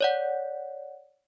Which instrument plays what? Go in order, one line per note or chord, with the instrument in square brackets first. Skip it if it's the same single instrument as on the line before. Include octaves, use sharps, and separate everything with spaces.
[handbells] C#5 D5 F#5